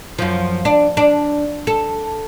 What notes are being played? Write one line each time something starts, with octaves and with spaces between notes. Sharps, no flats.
F#2 F3
D4
D4
A4